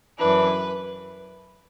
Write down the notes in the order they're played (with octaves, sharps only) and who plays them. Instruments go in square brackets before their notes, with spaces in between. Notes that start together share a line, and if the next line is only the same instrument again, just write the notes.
[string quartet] F#2 E3 D4 B4